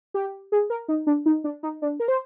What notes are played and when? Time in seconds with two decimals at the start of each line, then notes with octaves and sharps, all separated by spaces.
0.14 G4
0.52 G#4
0.70 A#4
0.88 D#4
1.07 D4
1.26 D#4
1.44 D4
1.63 D#4
1.82 D4
2.00 A#4
2.08 C5